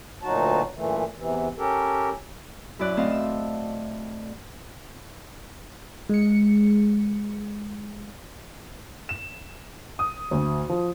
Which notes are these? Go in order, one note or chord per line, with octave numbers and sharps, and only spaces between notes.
D2 A#2 F#3 D#4 F#4 A5
F#2 A#2 E3 A3
E2 C3 E3
C#4 G4 A4 A#4
F#2 E4 D5 F#6
A2 A3 C4 D#5 F5 A5
E6
G#3 C#7
E7
D#6
D2
F3